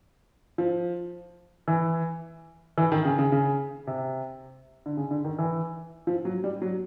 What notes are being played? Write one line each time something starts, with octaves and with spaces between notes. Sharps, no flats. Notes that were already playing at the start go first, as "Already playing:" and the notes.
F3
E3
E3
D#3
C#3
C#3
C#3
C3
D3
C#3
D3
D#3
E3
F3
F#3
G3
F#3